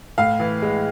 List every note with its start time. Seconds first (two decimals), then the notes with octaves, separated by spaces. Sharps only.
0.18 A2 F5
0.40 E3
0.62 G#3